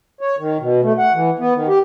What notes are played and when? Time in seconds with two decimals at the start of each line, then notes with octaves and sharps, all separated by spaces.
0.21 C#5
0.38 D#3
0.60 B2
0.83 A3
0.98 F#5
1.14 E3
1.39 B3
1.54 D#3
1.68 G4